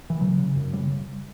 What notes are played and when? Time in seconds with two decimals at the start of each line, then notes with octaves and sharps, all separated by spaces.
0.10 E3
0.20 C#3 F#3
0.38 C#3
0.56 F#2
0.73 C#3 G3